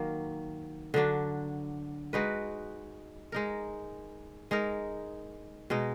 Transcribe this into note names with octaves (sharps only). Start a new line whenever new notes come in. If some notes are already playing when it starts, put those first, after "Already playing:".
Already playing: D#3 F#3 A#3
D3 F#3 D4
G#3 D#4 F#4 B4
G#3 D#4 A#4
G#3 D#4 A#4
B2 G#3 D#4